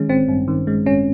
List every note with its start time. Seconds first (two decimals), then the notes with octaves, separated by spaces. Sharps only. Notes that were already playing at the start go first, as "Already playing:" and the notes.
Already playing: D#3 G#3 C#4
0.08 A1 C4
0.28 G2
0.48 D#3
0.67 G#3
0.86 A1 C#4